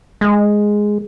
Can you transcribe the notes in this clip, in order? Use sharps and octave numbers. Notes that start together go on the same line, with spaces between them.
G#3